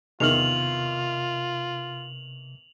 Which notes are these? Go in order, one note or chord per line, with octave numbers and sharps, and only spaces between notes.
E2 C3 D#3 F4 F6 F7 F#7